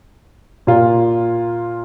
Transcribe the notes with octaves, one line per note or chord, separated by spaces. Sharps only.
A#2 A#3 F4